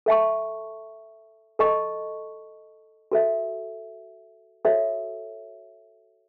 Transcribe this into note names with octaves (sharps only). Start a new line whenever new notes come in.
A4 E5 A5 C#6
A4 D#5 A5 C#6
F#4 A4 E5
F#4 A4 C#5 E5